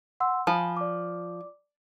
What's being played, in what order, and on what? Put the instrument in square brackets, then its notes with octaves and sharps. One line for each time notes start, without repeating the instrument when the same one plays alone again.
[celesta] F#5 C6 E6
[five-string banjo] F3 [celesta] G#5 B5
[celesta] D5 D6